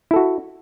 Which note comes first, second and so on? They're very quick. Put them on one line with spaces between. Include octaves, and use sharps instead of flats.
E4 A4 F#4